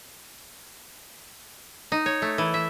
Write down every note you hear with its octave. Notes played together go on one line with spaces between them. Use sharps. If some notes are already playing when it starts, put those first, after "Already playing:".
D#4
C#5
A3
E3
E5